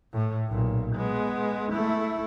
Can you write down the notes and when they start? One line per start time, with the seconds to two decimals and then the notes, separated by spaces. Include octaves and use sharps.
0.13 A2
0.48 B1 A#2
0.96 G#3 B3
1.72 A3 E4